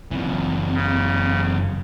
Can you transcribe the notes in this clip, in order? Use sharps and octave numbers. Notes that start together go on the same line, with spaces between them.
F#1 F#2 E3 C4
C#3